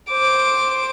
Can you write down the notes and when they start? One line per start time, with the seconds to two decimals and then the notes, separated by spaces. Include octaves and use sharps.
0.12 C5 D6